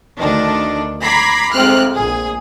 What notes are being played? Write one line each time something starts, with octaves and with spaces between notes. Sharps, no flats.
D2 D#3 D4
A#5 B5 D6 G#6 B6 C7
F2 G#2 C3 C4 F6 F#6
A#1 G#4